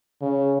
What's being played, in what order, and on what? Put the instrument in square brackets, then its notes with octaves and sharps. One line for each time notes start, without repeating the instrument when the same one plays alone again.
[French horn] C#3